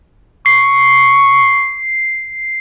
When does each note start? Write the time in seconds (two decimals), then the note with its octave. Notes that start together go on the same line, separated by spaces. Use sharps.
0.46 C#6 C7